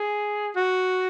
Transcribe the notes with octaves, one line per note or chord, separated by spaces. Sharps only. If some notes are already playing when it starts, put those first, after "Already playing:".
Already playing: G#4
F#4